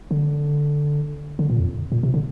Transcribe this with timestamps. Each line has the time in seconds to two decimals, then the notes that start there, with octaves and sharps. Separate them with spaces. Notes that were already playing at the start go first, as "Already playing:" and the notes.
0.11 D3
1.39 D3
1.50 A#2
1.60 F2
1.92 A#2
2.03 C3
2.14 D3